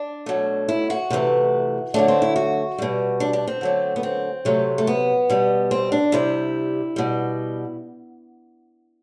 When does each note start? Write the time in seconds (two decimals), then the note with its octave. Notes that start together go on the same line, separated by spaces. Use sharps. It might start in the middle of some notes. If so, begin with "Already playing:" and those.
Already playing: D4
0.26 B2 F#3 A3
0.69 E4
0.90 F#4
1.10 C3 E3 A3
1.94 D3 F#3 A3 D4
2.08 C4
2.22 E4
2.36 F#4
2.78 B2 G3
3.20 D4
3.33 D4
3.47 C4
3.61 D3 F#3 A3
3.96 B3
4.03 C4
4.45 C3 F#3 A3
4.78 A3
4.87 B3
5.29 B2 G3
5.71 C4
5.92 D4
6.12 C3 G3 E4
6.96 B2 G3